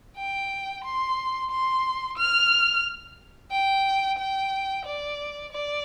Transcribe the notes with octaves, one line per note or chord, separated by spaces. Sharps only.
G5
C6
C6
F6
G5
G5
D5
D5